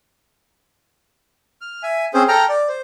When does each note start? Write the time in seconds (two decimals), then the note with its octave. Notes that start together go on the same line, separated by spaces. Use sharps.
1.61 F6
1.83 E5 G#5
2.14 C4 C#4 G#4 C5
2.28 A4 G5 A#5 F6
2.49 D5
2.68 C5